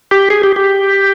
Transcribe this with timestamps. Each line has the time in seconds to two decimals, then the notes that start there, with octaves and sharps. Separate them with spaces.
0.11 G4
0.30 G#4
0.43 G4
0.56 G4